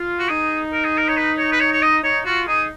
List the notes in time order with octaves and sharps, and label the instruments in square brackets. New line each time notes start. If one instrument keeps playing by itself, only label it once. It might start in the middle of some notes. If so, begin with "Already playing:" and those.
Already playing: [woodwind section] F4
[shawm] F#4
[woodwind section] D#4 [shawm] G#4
[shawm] A#4
G#4
A#4
C#5
B4
C#5
B4
C#5
C#5
D#5
[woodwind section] D#4 [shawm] C#5
[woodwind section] F4 [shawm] F#4
[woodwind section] D#4 [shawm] G#4